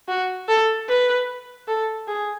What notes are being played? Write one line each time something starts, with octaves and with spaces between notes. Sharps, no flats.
F#4
A4
B4
A4
G#4